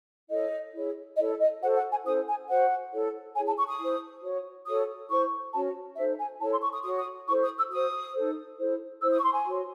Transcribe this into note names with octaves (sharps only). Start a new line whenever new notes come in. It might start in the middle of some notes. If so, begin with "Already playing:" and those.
E4 A4 C#5 D#5
E4 G#4 C#5
E4 A4 C#5 D#5
D#5
F#4 A4 C5 F#5
F#5
G#5
C#4 E4 A4 C5 D#6
G#5
F#4 C5 F#5
E4 A4 C#5
E4 G#4 C#5 G#5
A5
C#6
D#6
E4 C5
F#4 C#5
F#4 A4 C#5 D#6
E4 C5 C#6
C#4 F#4 C#5 A5
D#4 A4 C5 E5
G#5
E4 A4 C#5 A5
C6
C#6
D#6
F#4 C#5 D#6
D#6
E4 A4 C5 C#6
D#6
E6
F#4 C5 D#6
D#4 A4 C5
E4 A4 C5
E4 C5 E6
D#6
C#6
C6
G#5
F#4 C#5